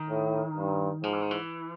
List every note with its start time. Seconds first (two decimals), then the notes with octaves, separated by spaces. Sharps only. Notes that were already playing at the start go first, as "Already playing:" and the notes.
Already playing: D#3
0.09 A2
0.56 G2
1.03 G#2 F3
1.13 E3
1.21 D#3
1.31 E3